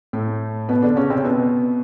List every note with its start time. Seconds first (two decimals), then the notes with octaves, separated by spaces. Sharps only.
0.13 A2 A3
0.69 B2 B3
0.82 D3 D4
0.96 C#3 C#4
1.10 C3 C4
1.24 B2 B3